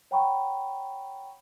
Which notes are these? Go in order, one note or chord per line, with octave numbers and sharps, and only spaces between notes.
C#5 F#5 G5 A#5 B5 C#6